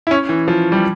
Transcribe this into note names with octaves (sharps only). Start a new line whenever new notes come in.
E4
C#4
E3
F3
G3